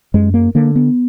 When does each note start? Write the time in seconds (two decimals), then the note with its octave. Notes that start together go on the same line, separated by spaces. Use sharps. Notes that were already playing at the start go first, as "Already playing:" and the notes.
0.14 F#2 G#3
0.34 A#3
0.55 D3 A#3
0.76 B3